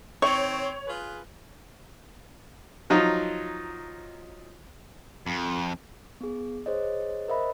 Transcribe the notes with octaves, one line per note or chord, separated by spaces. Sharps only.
D#3 C4 C#5 C#6
F4 G#4 B4
F3 F#3 D#4 F4
F2
B3 G#4
G#4 C5 C#5 D#5
A#4 C5 D#5 E5 B5